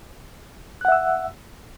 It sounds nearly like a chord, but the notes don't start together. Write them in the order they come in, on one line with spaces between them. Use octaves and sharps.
F#6 F#5 E5 E6